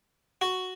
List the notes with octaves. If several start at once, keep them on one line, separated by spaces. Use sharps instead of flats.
F#4